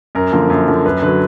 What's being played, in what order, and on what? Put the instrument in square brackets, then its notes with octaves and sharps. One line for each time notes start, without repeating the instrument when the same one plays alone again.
[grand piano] F#2 A#4
D3 F3 A#3
F#2
D3 F3 A#3
F#2 B4
D3 F#3 B4